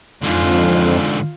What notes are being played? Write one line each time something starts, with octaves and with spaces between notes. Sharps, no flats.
F2 G#2 D3 F4